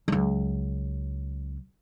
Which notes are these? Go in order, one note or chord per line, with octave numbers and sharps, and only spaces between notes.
C#2 F#3